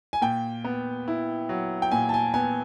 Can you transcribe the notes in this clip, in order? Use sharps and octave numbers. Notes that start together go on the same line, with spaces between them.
G#5
A#2 G5
B3
E4
F#3
G5
A#2 G#5
A5
G#5
B3 G#5